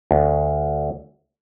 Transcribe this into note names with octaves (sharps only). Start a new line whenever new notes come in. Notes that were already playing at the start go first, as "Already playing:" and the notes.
D2